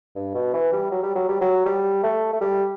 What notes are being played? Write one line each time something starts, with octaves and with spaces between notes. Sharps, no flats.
G2
B2
E3
G3
F#3
G3
F#3
G3
F#3
G3
A3
A3
G3